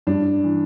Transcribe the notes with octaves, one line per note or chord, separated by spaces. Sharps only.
G2 D4
E3